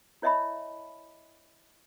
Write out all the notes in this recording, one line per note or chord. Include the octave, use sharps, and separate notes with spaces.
E4 C#5 D#5 E5 A5 B5